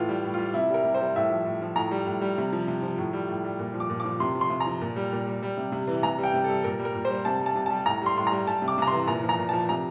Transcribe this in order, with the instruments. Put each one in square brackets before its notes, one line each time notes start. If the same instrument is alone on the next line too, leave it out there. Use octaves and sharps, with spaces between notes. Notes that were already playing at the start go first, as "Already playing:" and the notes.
Already playing: [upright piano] A2 E3 F4
G3
A2
G3 F4
C3 E4
G3 A#4
C3
C5
G3
A2 E5
F3
A2
F3
A2 A#5
G3
A2
G3
C3
F3
C3
F3
A2
G3
A2
G3
A#2
F3
D6
A#2
F3 D6
C3 C6
F3
C6
C3
A#5
F3
A#2
G3
A#2
G3
G3
C3
C3
E3
C3 A#5
G3
G5
C3
G3 A4
A#2 A#4
G3
A#4
A#2
C5
G3
C3 A5
G3
A5
C3
G3 A5
A2 A#5
G3 C6
A2 C6
G3 A#5
G3 A5
C3
D6
C3 A#5
E3 C6
A#2 A#5
F3
A#5
A#2
F3 A5
C3 A#5